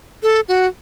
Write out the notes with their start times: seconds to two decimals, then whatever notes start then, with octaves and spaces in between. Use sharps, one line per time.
0.23 A4
0.48 F#4